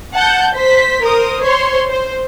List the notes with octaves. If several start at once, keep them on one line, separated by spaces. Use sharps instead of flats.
F#5 A5 G6
C5 B6
A#4 C5 D#6
C5 C#5 C6
C5